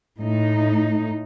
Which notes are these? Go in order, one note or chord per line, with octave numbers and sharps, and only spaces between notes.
A2 D#4